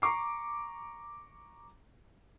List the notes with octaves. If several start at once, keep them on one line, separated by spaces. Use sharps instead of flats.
A#5 C#6 D6 C7